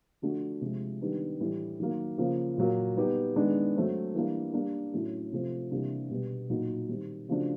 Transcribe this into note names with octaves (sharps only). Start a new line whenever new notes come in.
D3 F3 A3 D4 F#4
C3 F3 G#3
D#3 G3 B3 D4
A2 E3 G3
D#3 F#3 A#3
C#3 F3 A#3
A#2 F#3 A#3
G3 B3 D#4 G4
D#3 G#3 B3 D4
F#3 A3 C4
E3 G3 A#3 D4
G3 A#3 D4
A2 F#3 A3 C#4
C3 F3 A3 C4
C3 E3 G3 A#3 D4
B2 G3 B3
A#2 F#3 A#3 D#4 F#4
D#3 G3 C4
C#3 F3 A3 D4 F#4